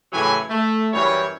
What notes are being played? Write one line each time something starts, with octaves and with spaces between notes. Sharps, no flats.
A2 C#3 E3 F#3 G4 G#5
A3
F#2 E3 G3 C#5